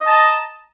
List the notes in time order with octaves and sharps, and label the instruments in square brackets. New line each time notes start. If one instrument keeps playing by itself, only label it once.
[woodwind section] D#5
A5
A#5